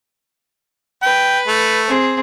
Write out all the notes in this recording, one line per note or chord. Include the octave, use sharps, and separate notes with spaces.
B4 G5
A3
C4 G#4